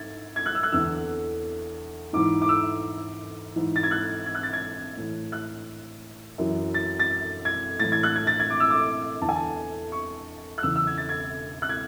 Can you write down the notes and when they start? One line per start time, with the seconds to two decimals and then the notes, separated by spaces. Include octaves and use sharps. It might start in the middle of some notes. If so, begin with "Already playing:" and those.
Already playing: G#2 G#6 A6
0.36 G#6
0.46 F#6
0.55 E6
0.63 F#6
0.72 E2 D3 E6
2.13 G#2 E3 D6
2.42 D6
2.49 E6
3.56 G#2 E3
3.76 A6
3.83 G#6
3.91 F#6
4.26 G#6
4.35 F#6
4.43 A6
4.53 G#6
4.97 A2 E3
5.32 F#6
6.38 F#2 E3
6.74 A6
6.99 A6
7.45 G#6
7.80 A2 E3 A6
7.92 G#6
8.03 F#6
8.16 G#6
8.27 A6
8.40 G#6
8.50 D6
8.60 E6
8.70 D6
9.22 E2 A5
9.25 D3 G#5
9.36 A5
9.92 C#6
10.58 F#6
10.63 E2 C#3 E3 E6
10.76 E6
10.87 G#6
10.98 A6
11.09 G#6
11.62 F#6
11.69 G#6